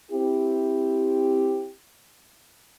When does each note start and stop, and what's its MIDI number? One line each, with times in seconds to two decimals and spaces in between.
0.11 1.71 60
0.11 1.71 64
0.11 1.71 67